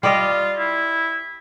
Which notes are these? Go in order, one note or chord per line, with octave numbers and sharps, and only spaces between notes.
G3 F4 D5 D#5
E4